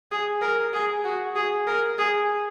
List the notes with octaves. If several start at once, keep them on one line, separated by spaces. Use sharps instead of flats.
G#4
A#4
G#4
F#4
G#4
A#4
G#4